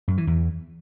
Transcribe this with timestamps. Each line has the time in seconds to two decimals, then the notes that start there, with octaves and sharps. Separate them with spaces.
0.08 F#2
0.17 E3
0.27 E2